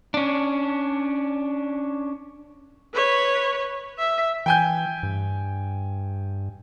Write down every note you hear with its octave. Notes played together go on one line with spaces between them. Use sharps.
C#4 D4
B4 C#5
E5
E3 G5 G#5 G6
G2